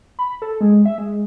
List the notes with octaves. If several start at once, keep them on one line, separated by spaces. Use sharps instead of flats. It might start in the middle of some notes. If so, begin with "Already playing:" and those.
B5
A4
G#3
E5
G#3